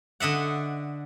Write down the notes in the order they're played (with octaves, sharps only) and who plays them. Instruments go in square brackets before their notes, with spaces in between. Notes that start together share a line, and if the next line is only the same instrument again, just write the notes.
[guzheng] D3 D#5 E5 F#5